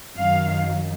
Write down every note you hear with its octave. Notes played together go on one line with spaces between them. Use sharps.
F#2 D#3 F#3 F5